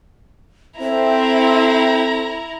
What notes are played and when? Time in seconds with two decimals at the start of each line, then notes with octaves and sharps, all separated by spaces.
0.80 C4 E4 A4 E5 A#5